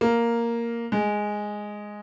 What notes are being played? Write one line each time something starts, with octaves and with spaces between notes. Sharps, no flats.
A#3
G#3